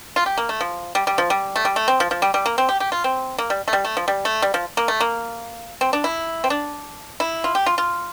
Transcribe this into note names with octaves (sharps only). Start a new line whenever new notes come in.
F4
G4
A#3
A3
F3
G3
G3
F3
G3
A3
G3
A3
C4
F3
F3
G3
G3
A#3
C4
G4
G4
F4
C4
A#3
G3
A3
G3
A3
F3
G3
A3
G3
F3
A#3
A3
A#3
C4
D4
E4
C4
D4
E4
F4
G4
F4
F4